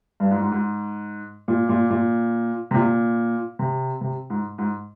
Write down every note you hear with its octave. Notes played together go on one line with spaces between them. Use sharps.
G2
G#2
G#2
G#2
A#2
A#2
A#2
C3
A#2
C3
C3
G#2
G#2